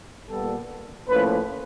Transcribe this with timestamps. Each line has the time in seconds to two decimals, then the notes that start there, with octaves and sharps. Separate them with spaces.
0.28 A#2 G3 B3 A4
1.09 A2 F3 A#3 C#4 B4